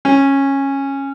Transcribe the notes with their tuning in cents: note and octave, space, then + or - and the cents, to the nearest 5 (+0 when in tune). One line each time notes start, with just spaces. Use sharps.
C#4 -15